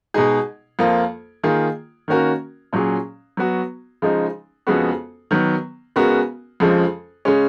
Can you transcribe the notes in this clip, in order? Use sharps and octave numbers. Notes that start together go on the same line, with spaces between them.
B2 G#3 D#4 G#4
F2 F3 A#3 F4
D#3 A#3 F4 G#4
D#3 A#3 C#4 F#4 A#4
A#2 F#3 C#4 G#4
F#3 B3 F#4
C#3 F3 G#3 D#4
F2 C#3 G#3 B3 F#4
D#3 F#3 B3
C#3 G#3 B3 F#4 A#4
F2 C#3 F3 G#3
C#3 G#3 C#4